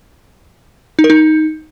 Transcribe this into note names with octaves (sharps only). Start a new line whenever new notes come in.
D#4
A#4
D#4